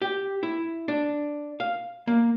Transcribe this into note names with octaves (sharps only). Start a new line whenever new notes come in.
G4
E4
D4
F5
A#3